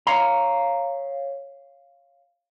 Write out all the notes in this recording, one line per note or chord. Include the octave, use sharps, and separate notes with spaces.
C#5 F5 A#5